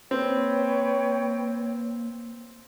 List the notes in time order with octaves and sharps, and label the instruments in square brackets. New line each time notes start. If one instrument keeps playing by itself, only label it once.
[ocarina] A#3 [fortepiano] C4 [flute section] B4 C#5 G5